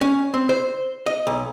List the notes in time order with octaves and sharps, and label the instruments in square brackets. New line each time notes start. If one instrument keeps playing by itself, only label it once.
[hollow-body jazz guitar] C#4
C4
C5
D#5
B1